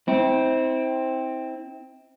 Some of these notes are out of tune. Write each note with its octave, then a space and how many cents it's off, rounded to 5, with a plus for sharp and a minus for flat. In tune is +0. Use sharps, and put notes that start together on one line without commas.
C4 +0 E4 -40